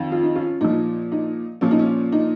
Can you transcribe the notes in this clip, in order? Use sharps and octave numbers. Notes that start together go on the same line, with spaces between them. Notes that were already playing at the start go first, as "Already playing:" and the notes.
Already playing: F2 D#3
F4
D#4
C#4 F4
A#2 F3 D#4
D#4
A#2 F3 C#4
D#4
C#4
D#4